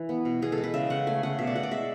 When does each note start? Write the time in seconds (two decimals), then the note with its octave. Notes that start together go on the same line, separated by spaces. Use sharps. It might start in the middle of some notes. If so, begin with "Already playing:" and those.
Already playing: E3
0.09 B3
0.25 B2
0.42 B2 G#4
0.52 A4
0.58 G#3
0.64 B4
0.74 C#3 E5
0.90 C#3 F#5
1.07 A3 G#5
1.23 C#3 F#5
1.39 B2 E5
1.47 D5
1.55 B2 F#5
1.63 D5
1.71 G#3 E5